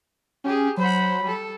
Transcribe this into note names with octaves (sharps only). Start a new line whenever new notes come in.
C#4 G4 G#4
F#3 C5 F#5 B5
G3 A4